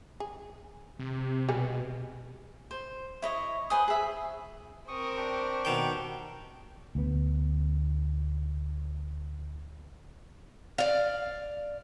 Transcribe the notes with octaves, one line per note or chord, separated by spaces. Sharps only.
G#4
C3
B2 G3 G#3 G#4
C5
E4 C#5 D#5
B4 C5 G#5 D#6
G#4 E5
C4 A#4 C#6 D#6
D4 G4 C#6
B2 D#3 G5
D2 B3
D5 F5